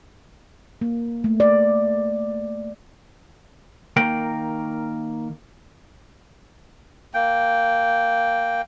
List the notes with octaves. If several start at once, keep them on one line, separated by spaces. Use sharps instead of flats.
A#3
A3
D5
D#3 A#3 A#4 G5
A#3 G5